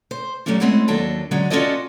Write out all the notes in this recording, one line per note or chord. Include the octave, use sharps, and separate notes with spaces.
C5
F#3 G3 A3 C#4 D4
G#3 A3 C4 C#4 E4 F#5
D#2 F#3 D4 A4 G5
D3 F#3 G#3 C#4 D4
C#4 F4 F#4 A4 D5 D#5